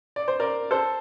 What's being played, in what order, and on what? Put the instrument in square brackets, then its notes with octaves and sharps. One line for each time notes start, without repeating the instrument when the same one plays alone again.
[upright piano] D5
C5
A#4 D5
A4 C5